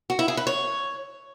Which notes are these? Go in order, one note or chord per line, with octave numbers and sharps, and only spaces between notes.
F#4
E4
G#4
B4
C#5